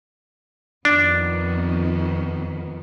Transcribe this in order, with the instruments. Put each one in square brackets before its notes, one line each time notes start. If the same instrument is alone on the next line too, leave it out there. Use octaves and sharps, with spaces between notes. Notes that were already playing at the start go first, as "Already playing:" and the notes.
[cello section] F2 D#3 B3 [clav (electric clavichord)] D4